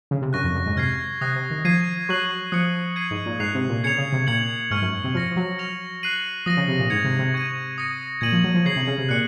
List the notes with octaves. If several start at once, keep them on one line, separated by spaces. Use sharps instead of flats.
C#3
C3
F#2 C#6 F#6 A#6
F2
F#2
G#2
C3 F6 G#6 C7
C3 D#6 F#6 A#6
C3
D#3
F3 G#6 C7 D#7
F#3 C#6 F#6 C7 F#7
F3 D#6 F#6 C#7 F#7
G#6 C7 D#7
G#2
A#2
G#2 F#6 C7 F7
C3
A#2
C#3 G#6 C#7 F7
C#3
C3
A#2 G#6 C#7 F#7
G#2 C#6 F6 G#6
F#2
C3
F3 F6 A#6 C#7
F3
F#3
F6 A#6 F7
F#6 C7 D#7 F#7
F3 D#6 A#6 D#7
C#3
C3
A#2
G#2 G#6 C#7 F7
C3
C3
C#6 G#6 D#7
D#6 A#6 C#7
A#2 G#6 D#7 F#7
F3
F#3
F3
C#3 G#6 C7 F#7
C3
C#3
C3
A#2 F#6 C#7